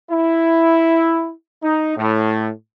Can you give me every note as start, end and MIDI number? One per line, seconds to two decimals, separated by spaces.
0.10 1.32 64
1.62 1.95 63
1.97 2.50 45